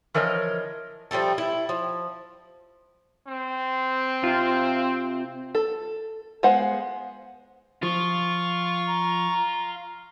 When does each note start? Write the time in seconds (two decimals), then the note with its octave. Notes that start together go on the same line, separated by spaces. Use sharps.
0.14 E3 F3 A#4 C#5 D#5
1.11 F3 G3 A3 A4
1.38 E4
1.69 F3
3.27 C4
4.24 C3 F4
5.55 A4
6.43 G#3 B3 C5 F5 F#5
7.83 F3 F4 C#6
8.87 A#5